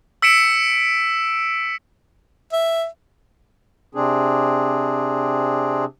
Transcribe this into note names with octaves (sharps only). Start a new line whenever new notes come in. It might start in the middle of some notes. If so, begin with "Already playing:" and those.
E6 B6 C#7 D7 E7
E5
C3 C4 D4 G#4